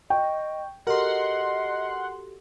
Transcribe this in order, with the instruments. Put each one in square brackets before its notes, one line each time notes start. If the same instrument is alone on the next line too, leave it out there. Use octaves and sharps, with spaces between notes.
[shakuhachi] D#5 [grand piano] G5 [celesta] C#6
[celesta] F#4 G4 A4 [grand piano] A#4 [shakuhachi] D#5 [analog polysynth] F#5 C6